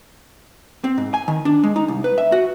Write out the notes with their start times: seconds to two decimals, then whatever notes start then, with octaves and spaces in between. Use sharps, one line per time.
0.84 C4
0.98 G#2
1.14 G#5
1.28 D#3
1.45 D4
1.63 G#3
1.76 D#4
1.88 C2
2.04 B4
2.18 E5
2.32 F#4